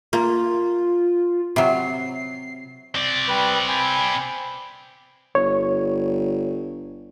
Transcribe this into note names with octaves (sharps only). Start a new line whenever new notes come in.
A#3 F4
C3 F#3 C7
C4 D5
G3 B4
G5 G#5 B5
G1 C#5